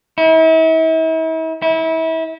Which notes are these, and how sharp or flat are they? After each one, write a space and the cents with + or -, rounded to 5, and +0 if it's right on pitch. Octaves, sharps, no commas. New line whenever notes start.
E4 -40
E4 -30